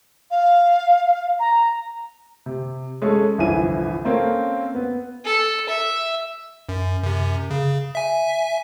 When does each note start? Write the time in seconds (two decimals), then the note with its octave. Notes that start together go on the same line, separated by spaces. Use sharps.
0.30 F5
1.40 A#5
2.46 C3
3.02 G#3 C#4 A4
3.38 G1 C2 F2 E3 G#5 D#7
4.05 A#3 C4 C#4 A4 A#4
4.75 B3
5.25 A4
5.68 E5
6.69 F#2
7.04 F#2 C3
7.50 C#3
7.95 E5 G#5